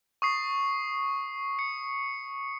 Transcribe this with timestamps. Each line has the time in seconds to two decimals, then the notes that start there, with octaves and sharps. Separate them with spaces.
0.22 C#6 D#6 C7
1.59 C#7